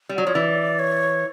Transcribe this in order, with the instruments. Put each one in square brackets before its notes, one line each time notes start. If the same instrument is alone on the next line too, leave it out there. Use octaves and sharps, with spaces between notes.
[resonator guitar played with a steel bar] G3
F#3
[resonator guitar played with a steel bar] F3 [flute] C#5
[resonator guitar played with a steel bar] E3 [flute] D5
[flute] C#5